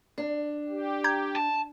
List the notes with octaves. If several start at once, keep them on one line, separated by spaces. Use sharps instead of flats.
D4
G4
A#5 G6 G#6
A5